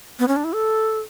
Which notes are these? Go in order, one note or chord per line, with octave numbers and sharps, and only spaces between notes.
B3
C#4
D4
E4
A4